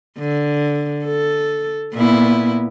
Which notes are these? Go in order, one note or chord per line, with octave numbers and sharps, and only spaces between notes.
D3
A4
A#2 B3 E4